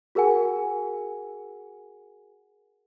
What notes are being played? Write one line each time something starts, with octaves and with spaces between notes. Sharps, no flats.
F#4 G#4 A#4 F#5 G#5